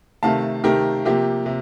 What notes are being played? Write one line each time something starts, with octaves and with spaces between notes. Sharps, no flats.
C3 D#3 A3 F5 A5
C3 D#3 A3 G4 A#4
C3 F3 A#3 G4
C3